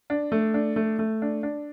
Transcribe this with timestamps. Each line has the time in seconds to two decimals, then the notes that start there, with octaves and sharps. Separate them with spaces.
0.10 D4
0.32 A3
0.54 D4
0.76 A3
0.99 A3
1.22 D4
1.43 D4